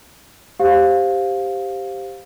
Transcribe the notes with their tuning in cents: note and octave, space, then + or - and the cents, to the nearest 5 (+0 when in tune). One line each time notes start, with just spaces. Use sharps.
G4 +0 C5 +0 F5 +10